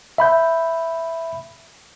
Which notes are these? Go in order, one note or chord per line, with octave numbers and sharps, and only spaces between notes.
E5 B5 G6